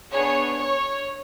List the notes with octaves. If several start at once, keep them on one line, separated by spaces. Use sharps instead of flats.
B3 D4 G#4 C#5
C#5